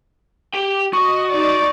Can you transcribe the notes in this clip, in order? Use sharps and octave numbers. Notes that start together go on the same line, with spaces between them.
G4 G5
F#4 D#5 C#6
D#4 D5